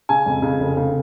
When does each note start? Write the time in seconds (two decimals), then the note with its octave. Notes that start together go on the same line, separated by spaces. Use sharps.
0.09 C#3 G#5
0.26 F2
0.42 C#3
0.60 F1
0.77 C#3